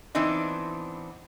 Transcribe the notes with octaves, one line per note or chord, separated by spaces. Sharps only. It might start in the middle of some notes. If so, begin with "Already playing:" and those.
E3 B3 C4 D4 D#4